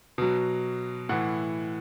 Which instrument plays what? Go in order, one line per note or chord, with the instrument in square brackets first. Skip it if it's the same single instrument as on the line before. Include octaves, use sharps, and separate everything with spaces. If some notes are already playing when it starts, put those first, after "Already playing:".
[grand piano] B2 F#3
A2 E3 F#5